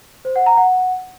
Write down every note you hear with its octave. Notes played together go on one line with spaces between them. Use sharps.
C5
F#5
A#5
F#5